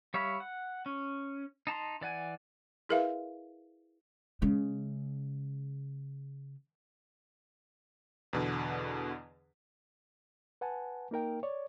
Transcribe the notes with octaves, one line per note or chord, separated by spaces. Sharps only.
G3 C#5 E5 F5 B5
F#5
C#4
D#4 A5 A#5 C6
E3 D5 F#5 G#5
E4 G#4 A#4 B4 E5 F5
C#3 G#3
E2 B2 D3
B4 F#5 G#5 A5
A#3 D#4 A#4 G5
C#5 D5